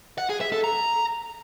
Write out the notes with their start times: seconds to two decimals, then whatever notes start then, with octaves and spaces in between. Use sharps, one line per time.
0.18 F#5
0.29 G#4
0.41 E5
0.52 A4
0.64 A#5